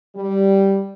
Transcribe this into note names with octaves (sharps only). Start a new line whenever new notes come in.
G3